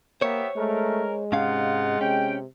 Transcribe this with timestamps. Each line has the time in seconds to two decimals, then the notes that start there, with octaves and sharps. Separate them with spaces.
0.21 A#3 B3 G4 C5 C#5 E5
0.57 G#3 A3 C#4 A#4
1.32 G#2 C3 C#4 D#4 F4 F5 F#5
2.01 C3 C#4 G5